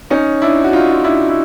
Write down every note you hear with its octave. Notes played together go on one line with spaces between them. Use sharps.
C#4 D#4
D4 E4
F#4
D#4 F4
F4
D4 E4
E4